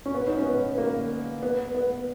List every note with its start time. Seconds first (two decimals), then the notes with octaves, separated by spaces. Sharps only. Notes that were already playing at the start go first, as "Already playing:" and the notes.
0.06 C#4
0.14 B3
0.27 D#4
0.37 C#4
0.46 B3
0.78 A#3
1.43 B3
1.75 B3